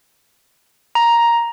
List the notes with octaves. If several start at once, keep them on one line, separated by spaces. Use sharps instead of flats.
A#5